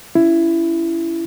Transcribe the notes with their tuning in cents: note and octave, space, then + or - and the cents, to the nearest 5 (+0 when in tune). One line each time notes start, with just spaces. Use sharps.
C#4 +25 E4 +15